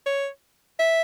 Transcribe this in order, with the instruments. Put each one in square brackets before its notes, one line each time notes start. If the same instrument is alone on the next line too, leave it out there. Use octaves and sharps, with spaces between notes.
[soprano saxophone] C#5
E5